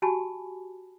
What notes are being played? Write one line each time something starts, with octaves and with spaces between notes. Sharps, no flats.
F#4 G4 G#5 A5 B5 C#6